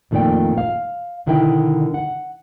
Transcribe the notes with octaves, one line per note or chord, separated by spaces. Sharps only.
F2 A#2 D#3 A3 D5 G5
F5
B2 D3 D#3 D4 E4 G5
F#5